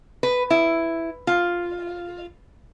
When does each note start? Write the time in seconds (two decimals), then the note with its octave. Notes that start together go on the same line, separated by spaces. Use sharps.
0.23 B4
0.50 E4
1.27 F4